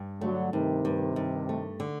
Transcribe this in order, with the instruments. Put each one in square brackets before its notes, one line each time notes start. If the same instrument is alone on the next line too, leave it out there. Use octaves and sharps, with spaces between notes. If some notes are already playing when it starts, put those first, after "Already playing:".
Already playing: [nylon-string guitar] G2
[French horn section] D3 F#3 [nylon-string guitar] A3
[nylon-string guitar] G2 [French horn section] C3 D#3
[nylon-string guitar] G2
G2
A3
D3